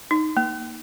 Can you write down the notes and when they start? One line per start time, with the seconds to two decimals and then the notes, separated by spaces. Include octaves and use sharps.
0.11 D#4
0.37 A#3